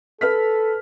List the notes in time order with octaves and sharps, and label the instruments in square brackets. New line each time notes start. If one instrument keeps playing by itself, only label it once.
[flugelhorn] A4 [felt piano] B4 F6 B6